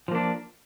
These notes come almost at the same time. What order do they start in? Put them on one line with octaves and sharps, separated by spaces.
F3 A#3 D4